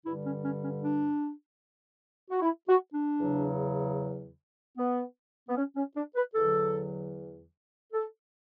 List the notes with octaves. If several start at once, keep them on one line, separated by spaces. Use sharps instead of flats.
G2 D3 G3 E4
C#4
C#4
C#4
D4
F#4
E4
F#4
D4
E2 C#3 F#3
B3
B3
C#4
C#4
D4
B4
E2 D3 F#3 A4
A4